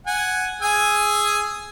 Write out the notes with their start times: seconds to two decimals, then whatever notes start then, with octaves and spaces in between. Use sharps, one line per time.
0.07 F#5 G#5
0.62 G#4 G#5 E6